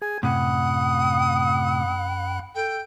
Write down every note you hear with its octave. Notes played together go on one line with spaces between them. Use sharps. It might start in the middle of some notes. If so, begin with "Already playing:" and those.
G#4 G#5 G#6
F#2 A2 C3 F#5 B5 D#6 F#6
A4 G5